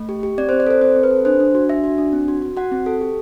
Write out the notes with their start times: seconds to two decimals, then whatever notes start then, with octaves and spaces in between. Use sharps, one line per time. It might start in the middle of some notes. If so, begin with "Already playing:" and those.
Already playing: A3
0.09 G4
0.23 G4
0.38 C4 D5
0.49 C5
0.52 C4
0.60 D5
0.67 A4 C5
0.81 C4 C5
0.96 C4
1.03 B4
1.11 A4
1.25 D4 C5
1.40 D4
1.55 F#4
1.69 D4 E5
1.84 F#4
1.98 D4
2.13 C4
2.28 F#4
2.42 F#4
2.57 F#4 F#5
2.72 C4
2.86 A4
3.01 G4